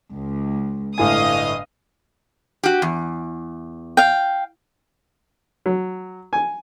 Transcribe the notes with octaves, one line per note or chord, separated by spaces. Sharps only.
C#2
G1 A2 D#5 F5 G#5 D#6
F#4 G4
E2
F5 G5
F#3
G#5